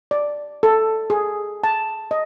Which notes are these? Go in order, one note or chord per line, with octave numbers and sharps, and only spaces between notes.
D5
A4
G#4
A5
D#5